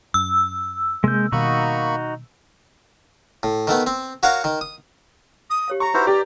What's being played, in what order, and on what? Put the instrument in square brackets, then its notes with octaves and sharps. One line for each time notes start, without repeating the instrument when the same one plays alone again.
[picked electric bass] F#2 [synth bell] E6
[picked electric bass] C3 A#3 [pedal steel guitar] G#3 G6
[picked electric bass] B2 D#3 G3 [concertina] A#3 B5 C#6 [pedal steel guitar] D#4 F#4
[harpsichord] A2
D#3 A3 B3
C4
F#4 A#4 C#5 F5 F#5
D#3
D#6
[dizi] D#6
[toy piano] G4 C#5 F5
[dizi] A#5 [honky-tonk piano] C#6
[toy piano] D#4 B4 F#5 [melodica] E4 F#4 C5
[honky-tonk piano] G4 [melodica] D5 [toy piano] A5